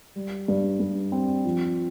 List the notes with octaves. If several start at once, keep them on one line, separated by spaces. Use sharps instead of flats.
G3
G2
G2
C4
F3